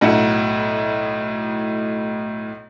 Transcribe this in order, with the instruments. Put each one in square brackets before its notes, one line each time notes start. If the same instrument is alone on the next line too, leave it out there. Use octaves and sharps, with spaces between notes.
[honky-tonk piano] B1 A2 E4 F#5